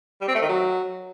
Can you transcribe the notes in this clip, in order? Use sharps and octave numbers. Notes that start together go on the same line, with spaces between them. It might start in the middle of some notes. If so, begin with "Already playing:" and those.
G3
C4
A3
D#3
F#3